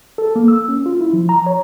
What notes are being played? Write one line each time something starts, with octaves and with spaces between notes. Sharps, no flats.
A4
A#3
E6
C#4
F4
E4
F3
A#5
C#5